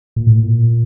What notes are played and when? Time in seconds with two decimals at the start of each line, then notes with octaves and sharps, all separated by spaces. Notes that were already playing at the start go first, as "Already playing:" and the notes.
0.16 A#2
0.27 A2
0.37 A#2